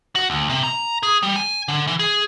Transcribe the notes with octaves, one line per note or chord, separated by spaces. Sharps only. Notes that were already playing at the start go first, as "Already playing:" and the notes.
F#4
D2
C3
A#5
G#4
G3
G#5
D3
E3
G#4